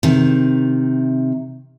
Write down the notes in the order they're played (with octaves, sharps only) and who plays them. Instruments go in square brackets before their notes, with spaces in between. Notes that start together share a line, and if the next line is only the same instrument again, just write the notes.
[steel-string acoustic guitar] C3 D#3